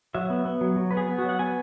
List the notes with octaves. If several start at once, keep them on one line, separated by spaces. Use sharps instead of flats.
F#3 E5
B3
B3
F#3
F#3
B3 B4
G#4
B3
F#4
F#3
F#5
B3 G#5